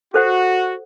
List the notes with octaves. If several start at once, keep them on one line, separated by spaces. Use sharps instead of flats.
F#4 A4 C5 F#5